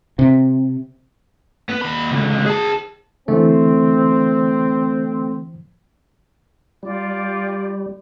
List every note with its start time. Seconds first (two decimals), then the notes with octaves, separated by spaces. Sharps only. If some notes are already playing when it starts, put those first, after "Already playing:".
0.19 C3
1.69 B3 B4
1.81 D#2 B5
2.12 C#2 D3
2.46 G#4 A5
3.28 D3 E3 A3 C4
6.83 G3 F4 G4 D5